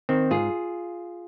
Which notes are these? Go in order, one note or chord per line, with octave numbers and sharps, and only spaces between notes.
D#3 C4
G#2 F4 G#4